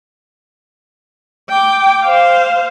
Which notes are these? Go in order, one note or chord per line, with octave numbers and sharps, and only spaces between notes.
G5 D6
C5 F5